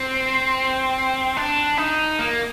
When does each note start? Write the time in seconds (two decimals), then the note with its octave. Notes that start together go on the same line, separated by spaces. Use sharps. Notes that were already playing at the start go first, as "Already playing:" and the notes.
Already playing: C4
1.37 D4
1.78 D#4
2.19 A#3